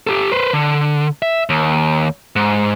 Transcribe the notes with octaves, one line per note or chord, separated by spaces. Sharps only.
G4 A4
B4 C5
D3
E5
D#2
G#2